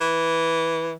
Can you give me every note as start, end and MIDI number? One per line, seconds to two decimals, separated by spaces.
0.01 0.92 52